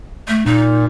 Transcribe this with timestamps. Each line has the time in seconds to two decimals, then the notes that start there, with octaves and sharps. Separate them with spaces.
0.28 A3
0.46 A#2 D#4